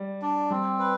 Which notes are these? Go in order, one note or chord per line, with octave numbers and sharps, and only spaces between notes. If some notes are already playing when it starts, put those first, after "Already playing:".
Already playing: G3
D4
G3 C4
B4